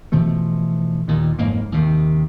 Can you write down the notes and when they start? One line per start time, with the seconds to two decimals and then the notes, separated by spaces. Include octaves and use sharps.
0.12 B2 E3 F3 A3
1.08 D#2 A#2 D#3
1.39 F#1 F2 G#2 A#3
1.72 D#2 C3 D#3